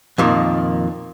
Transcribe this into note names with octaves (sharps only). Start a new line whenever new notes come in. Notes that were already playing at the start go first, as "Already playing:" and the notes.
F2 A#2 D#3